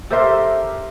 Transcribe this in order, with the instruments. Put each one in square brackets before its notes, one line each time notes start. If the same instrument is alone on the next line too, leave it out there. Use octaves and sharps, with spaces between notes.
[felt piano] G4 A#4 C6 [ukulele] A4 C5 E5